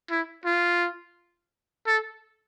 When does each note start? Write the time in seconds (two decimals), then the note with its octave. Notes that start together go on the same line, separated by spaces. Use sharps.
0.11 E4
0.45 F4
1.86 A4